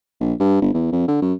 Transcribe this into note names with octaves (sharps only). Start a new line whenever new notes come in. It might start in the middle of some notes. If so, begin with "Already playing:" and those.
A#1
G2
G1
E2
F2
D3
F#2